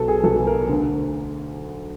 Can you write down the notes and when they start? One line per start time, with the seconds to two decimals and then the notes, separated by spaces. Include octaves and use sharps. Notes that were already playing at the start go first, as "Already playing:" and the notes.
Already playing: B1 B2 A4
0.08 G#4
0.24 B1 B2 A4
0.47 A#4
0.69 D2 D3